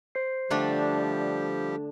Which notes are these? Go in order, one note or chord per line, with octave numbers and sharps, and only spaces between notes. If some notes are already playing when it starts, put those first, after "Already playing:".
C5 C7
D3 F3 G3 A3 D4 G4